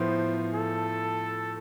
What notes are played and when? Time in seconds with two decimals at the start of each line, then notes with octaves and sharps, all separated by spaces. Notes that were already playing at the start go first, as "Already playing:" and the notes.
Already playing: A2 F3 B3 C5
0.54 A4